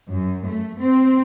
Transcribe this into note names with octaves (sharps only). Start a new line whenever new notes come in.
F#2
A3
C4